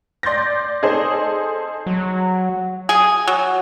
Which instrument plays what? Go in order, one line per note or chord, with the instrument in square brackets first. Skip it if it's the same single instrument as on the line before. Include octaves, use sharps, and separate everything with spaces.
[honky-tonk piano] D5 C6 G6 A6 A#6
D#4 G#4 A4 C5
[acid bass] F#3
[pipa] G#4
F#3